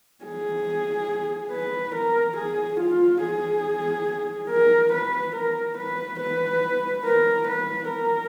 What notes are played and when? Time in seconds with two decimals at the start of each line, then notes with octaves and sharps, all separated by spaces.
0.24 G#4
1.52 B4
1.95 A#4
2.37 G#4
2.80 F4
3.22 G#4
4.50 A#4
4.92 B4
5.35 A#4
5.77 B4
6.20 B4
7.04 A#4
7.48 B4
7.90 A#4